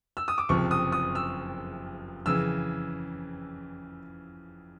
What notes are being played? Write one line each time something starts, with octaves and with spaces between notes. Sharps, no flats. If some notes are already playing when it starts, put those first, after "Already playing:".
E6
D#6
D6
F#1 F2 C3 F3 C#6
D#6
D#6
E6
F2 C#3 E3 E6